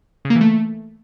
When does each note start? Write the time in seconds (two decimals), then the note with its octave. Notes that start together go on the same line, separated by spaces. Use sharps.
0.25 C#3
0.30 A#3
0.35 E3
0.41 A3